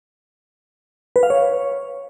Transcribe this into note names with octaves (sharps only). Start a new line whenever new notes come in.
B4
F5
C#5